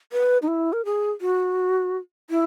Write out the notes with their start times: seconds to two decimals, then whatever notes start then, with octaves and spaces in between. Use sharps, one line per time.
0.13 B4
0.42 D#4
0.48 E4
0.73 A#4
0.85 G#4
1.21 F#4
2.30 E4